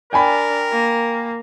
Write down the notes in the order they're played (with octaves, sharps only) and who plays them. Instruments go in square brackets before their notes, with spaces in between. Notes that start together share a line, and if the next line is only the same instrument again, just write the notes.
[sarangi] D4 [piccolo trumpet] A#4 [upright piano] G5 G#5 B5
[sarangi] A#3